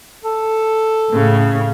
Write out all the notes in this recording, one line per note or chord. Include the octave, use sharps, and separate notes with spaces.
A4
A2 C#3